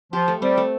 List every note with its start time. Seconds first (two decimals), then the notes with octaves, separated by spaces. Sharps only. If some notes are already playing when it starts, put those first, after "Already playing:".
0.13 F3 G4
0.28 A3
0.42 G3 C4
0.57 A3